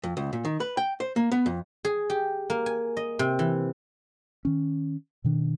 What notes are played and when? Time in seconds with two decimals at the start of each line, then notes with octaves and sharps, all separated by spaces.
0.03 F2
0.17 C#2
0.33 A#2
0.45 D#3
0.60 B4
0.77 G5
1.00 C5
1.16 A#3
1.32 B3
1.46 F2
1.85 G#4
2.10 G4
2.50 A#3
2.66 G#5
2.97 D#5
3.19 C3
3.39 E3
4.45 D#3 C#4
5.24 B2 D#3 D4